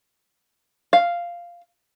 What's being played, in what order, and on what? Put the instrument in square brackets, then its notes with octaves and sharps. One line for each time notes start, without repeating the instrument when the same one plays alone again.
[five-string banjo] F5